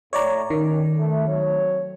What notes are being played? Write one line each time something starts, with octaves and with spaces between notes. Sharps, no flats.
A2 C#5 D5 A#5
G1 D#3 C#4 A#4
A3
F#3 C4 C#5